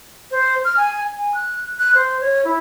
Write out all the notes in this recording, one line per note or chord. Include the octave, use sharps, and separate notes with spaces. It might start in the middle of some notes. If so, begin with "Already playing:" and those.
C5
F6
G#5
G#5
F#6
F#6
C5
C#5
E4